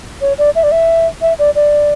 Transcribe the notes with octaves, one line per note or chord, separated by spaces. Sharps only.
C#5
D5
E5
D5
E5
E5
D5
D5